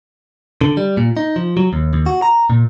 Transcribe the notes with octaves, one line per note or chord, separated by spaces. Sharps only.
D3
G3
A#2
D#4
F3
F#3
D#2
D#2
F#4
A#5
A#2